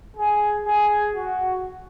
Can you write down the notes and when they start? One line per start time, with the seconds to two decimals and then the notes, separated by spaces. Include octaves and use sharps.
0.17 G#4
0.66 G#4
1.14 F#4